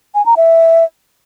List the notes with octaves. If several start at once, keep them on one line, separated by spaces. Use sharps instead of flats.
G#5
A#5
E5